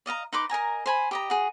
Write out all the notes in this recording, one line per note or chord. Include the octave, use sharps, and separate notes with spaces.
D5 D#5 F5 A#5
D#4 B4 C6 D6
A#4 D#5 G#5 A#5
C5 G#5 B5
G4 D#5 A#5
F#4 G#4